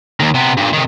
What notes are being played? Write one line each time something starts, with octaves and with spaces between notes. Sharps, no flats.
D#2 D#3
C3 B3
G2 A#2
C3 D#3